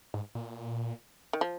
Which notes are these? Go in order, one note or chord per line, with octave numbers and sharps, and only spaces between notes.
G#2
A#2
D#3
F3